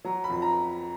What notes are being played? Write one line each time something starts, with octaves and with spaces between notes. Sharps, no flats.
F#3 A#5
B5
F2
A#5